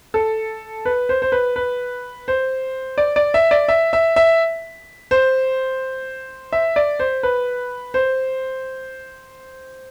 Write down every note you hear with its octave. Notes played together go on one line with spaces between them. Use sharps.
A4
B4
C5
C5
B4
B4
C5
D5
D5
E5
D5
E5
E5
E5
C5
E5
D5
C5
B4
C5